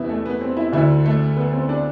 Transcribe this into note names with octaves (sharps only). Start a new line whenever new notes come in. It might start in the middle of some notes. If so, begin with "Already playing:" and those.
Already playing: E2 C3 E3 B3 E4
A3
B3
C4
E4
D2 D3 E4
A3
B3
C4
D4